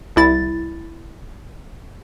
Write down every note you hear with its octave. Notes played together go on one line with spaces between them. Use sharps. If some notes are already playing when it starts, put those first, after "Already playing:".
C2 E4 A6